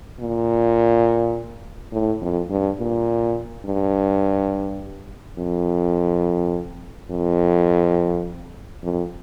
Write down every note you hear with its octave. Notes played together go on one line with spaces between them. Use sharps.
A#2
A2
F2
G2
A#2
G2
F2
F2
F2